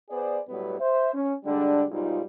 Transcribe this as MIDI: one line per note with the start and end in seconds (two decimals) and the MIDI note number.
0.10 0.38 59
0.10 0.38 68
0.10 0.38 71
0.10 0.38 72
0.10 0.38 74
0.48 0.78 45
0.48 0.78 54
0.48 0.78 55
0.48 0.78 59
0.79 1.12 72
0.79 1.12 76
1.13 1.34 61
1.44 1.84 50
1.44 1.84 55
1.44 1.84 56
1.44 1.84 62
1.90 2.21 35
1.90 2.21 44
1.90 2.21 55
1.90 2.21 63
1.90 2.21 65